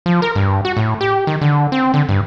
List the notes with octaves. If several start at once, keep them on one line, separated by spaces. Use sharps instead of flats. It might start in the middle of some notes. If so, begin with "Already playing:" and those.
F3
A#4
G2
F#4
A2
G4
D#3
D3
C4
D3
G2